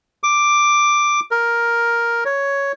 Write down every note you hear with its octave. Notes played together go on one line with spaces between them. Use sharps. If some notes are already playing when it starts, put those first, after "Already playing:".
D6
A#4
C#5